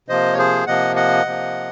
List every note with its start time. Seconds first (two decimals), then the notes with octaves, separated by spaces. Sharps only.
0.08 C3 F3 A#3 C5 D#5
0.33 C#5
0.38 G#4 C5
0.67 C3 F3 A#3 D#5 F#5
0.96 D#5 F#5
1.25 C3 F3 A#3